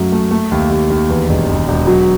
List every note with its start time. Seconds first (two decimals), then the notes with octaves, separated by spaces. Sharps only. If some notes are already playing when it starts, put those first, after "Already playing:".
Already playing: F#2 F#3 A3
0.12 A3
0.31 A3
0.51 D#2
0.71 D#2
0.90 D#2
1.09 E2
1.29 E1
1.48 E1
1.68 E1
1.87 F#3